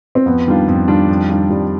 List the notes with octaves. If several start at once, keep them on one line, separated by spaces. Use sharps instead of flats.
C4
F2 B3
D#3 G3 D4 F4
F2
D#3 G3 D4 F4
F2
D#3 G3 D4 F4
F2 G3